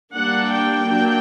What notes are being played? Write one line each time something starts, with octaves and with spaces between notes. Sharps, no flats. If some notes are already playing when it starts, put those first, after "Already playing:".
G3 A#3 D4 F#5
G5
F#3 A#3 D4